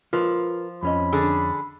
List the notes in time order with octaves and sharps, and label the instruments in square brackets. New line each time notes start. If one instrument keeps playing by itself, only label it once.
[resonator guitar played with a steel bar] F3 [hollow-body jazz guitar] F4 A#4 B4
[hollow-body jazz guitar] F2 C#4 D#5 [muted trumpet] B5
[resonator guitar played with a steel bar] D3 D4 G#4